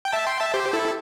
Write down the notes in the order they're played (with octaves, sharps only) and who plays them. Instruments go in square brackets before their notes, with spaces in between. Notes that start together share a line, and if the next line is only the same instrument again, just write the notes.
[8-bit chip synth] G5
E5 A5
G5 C6
E5 A5
G4 C5
E4 A4